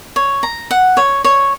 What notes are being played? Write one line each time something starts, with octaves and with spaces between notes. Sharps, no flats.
C#5
A#5
F#5
C#5
C#5